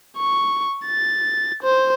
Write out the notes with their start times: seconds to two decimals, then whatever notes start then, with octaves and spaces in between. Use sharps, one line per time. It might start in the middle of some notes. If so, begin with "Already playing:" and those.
0.17 C#6
0.86 A6
1.63 C5